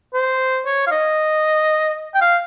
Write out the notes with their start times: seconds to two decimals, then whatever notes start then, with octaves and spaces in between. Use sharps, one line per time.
0.13 C5
0.66 C#5
0.87 F5
0.91 D#5
2.14 G5
2.21 F5